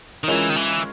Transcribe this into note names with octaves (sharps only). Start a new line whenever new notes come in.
D#3
E3 G#3 C#4 F4 A#4 C#5
D#3
E3